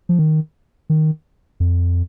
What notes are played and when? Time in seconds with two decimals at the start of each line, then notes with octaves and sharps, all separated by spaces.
0.09 F3
0.19 D#3
0.90 D#3
1.60 F2